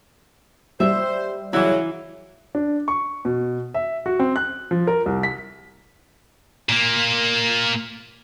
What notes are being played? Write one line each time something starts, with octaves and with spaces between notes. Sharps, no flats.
G3 C5 E5
C#3 E3 F#3 E4
D4
C#6
B2
E5
F#4
C4
F#6
F3
A#4
C2
B6
A#2 A#3